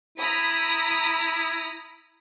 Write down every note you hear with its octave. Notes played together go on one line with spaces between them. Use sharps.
E4 A#5 B5 D#6